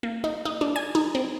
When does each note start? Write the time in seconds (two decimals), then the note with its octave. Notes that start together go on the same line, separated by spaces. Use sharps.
0.03 A#3
0.24 D#4
0.45 D#4
0.61 D4
0.76 G#5
0.95 D#4
1.15 C4